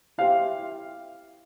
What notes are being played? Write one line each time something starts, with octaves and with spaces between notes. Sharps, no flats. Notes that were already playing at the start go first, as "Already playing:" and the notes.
E4 G4 C5 E5 F5